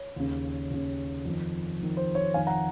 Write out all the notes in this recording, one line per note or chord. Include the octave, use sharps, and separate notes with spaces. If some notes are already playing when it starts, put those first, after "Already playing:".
Already playing: C#5
D#2 C#3
D#2 C#3
F2 D#3
F2 D#3
C5
C#5
F2 D#3 F5 G#5
F#5 A#5